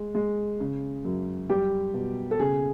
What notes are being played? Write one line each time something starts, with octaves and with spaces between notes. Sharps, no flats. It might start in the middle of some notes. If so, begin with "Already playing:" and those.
Already playing: G#3
G#3
C#3
F#2
G3 G4
B2
A4
C#3 G#4